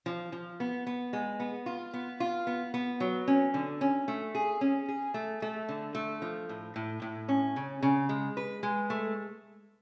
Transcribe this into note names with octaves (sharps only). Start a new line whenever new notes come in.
F3
F3
B3
B3
G#3
B3
F4
B3
F4
B3
B3
F#3
C#4
D3
C#4
A3
G#4
C#4
G#4
A3
A3
D3
A3
F3
A2
A2
A2
C#4
C#3
C#3
G#3
B4
G#3
A3